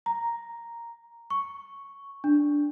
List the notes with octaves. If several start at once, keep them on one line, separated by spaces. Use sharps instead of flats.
A#5
C#6
D4